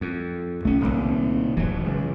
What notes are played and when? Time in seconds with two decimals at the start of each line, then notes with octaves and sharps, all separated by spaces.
0.01 F2
0.65 B1 A3 C#4
0.81 D#1 C2 A#2 D#3
1.57 D1 G#1 F#2 E3 F#3
1.85 C#3 G#3